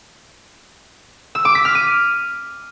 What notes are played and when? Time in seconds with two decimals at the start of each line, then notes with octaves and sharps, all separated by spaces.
1.35 E6
1.45 D6
1.55 B6
1.65 F6
1.75 D#7